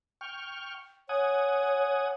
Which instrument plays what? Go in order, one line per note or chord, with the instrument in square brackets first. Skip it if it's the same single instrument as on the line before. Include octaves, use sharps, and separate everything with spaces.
[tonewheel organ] G5 C#6 F6
[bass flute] C#5 [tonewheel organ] F#5 G#5 D#6